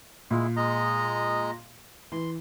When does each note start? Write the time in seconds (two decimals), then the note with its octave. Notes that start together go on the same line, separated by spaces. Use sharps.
0.31 A#2 G#3 E4
0.57 G#3 D#5 A#5
2.12 E3 C6